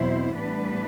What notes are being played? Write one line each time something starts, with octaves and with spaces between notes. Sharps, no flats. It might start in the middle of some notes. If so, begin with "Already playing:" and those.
Already playing: E2 B2 F#3 C4 E4 C5
A2 E3 G3 B3 D4 B4